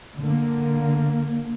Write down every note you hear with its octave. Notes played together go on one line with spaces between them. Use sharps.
D3 A#3